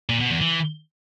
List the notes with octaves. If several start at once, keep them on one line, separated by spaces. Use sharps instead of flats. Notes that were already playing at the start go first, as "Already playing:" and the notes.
A#2
B2
E2
E3